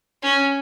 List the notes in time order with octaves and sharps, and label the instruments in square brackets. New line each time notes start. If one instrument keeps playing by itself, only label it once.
[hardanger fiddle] C#4